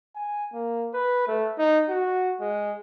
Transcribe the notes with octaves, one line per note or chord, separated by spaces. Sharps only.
G#5
A#3
B4
A3
D#4
F#4
G#3